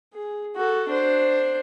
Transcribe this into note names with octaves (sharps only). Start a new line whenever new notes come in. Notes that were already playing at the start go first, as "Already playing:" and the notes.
G#4
F#4 A4
D4 C5